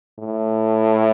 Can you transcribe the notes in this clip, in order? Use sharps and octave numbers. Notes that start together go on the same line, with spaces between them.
A2